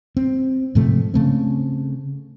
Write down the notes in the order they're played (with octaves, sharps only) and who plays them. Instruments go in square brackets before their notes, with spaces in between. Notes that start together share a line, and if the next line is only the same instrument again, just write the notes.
[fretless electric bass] C4
G#2 C3 F3 A3
C#3 A3 C4